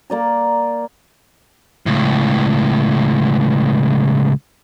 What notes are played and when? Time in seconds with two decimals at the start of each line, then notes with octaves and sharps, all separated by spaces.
0.10 A#3 D5 A#5
1.86 C#2 A2